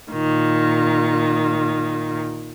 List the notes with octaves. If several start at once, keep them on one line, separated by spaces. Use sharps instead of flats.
A#2 D#3